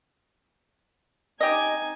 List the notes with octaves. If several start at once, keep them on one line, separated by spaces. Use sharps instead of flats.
D#4 G4 D#5 G#5